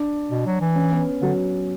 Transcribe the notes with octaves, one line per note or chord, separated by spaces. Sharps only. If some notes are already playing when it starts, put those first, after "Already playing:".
Already playing: D4
B2
F#3
E3
C#4
B3
D3 F#3